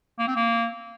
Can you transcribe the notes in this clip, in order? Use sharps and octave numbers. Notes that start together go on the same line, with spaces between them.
A#3
C4
A#3